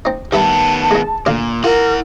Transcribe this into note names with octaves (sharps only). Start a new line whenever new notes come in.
C4 D#4
G2 D#3 B3 E5 A5 B5
G#3 D#4
D2 A#2 D4 F5
E4 F4 A#4 F#5